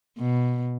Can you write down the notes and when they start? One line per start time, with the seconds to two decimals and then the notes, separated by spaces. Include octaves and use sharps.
0.18 B2